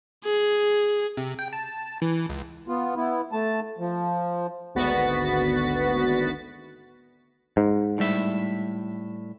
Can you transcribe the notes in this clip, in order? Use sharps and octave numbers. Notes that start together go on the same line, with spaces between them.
G#4
C3
G5
A5
E3
C#2
B3 F4
B3 E4
A3 A5
F3
G#1 D2 B3 F#4 A6 B6
G#2
A2 G3 E5